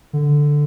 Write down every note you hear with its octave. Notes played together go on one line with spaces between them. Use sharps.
D3